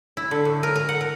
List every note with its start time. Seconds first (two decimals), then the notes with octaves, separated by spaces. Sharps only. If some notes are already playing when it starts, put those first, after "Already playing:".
0.17 E4
0.31 D3
0.45 A2
0.63 A#4
0.76 A#4
0.89 F#5
1.01 A#4